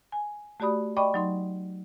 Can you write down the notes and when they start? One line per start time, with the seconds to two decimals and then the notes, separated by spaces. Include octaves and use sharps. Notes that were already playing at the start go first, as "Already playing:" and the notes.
0.12 G#5
0.60 A3 F#4 G4 D5 B5 D#6
0.97 D5 D#5 G5 B5 C#6 D6
1.14 F#3 D#4 C6